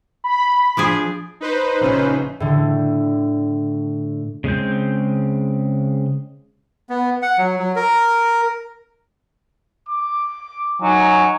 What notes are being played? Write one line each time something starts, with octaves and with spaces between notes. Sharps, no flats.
B5
F3 D4 G#4
D#4 B4 C5
A#1 C#3 C#4
A2 D3
C#3 G#3 C4 G6
B3
F#5
F#3
F#3
A#4
D6
F#3 D#4 G#5